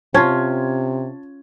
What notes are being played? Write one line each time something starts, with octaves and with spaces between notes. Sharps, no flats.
C3 C#4 F4 A5 G#6